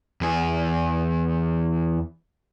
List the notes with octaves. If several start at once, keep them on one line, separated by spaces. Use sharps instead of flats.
E2 G#4